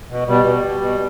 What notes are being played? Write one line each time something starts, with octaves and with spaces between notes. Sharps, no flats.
B2
B2 G3
B2
B2
B2